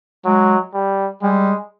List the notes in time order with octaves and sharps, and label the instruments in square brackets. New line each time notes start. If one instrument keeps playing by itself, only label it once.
[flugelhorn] F#3 [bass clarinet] G#3
[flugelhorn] G3
[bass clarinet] G3 [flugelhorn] G#3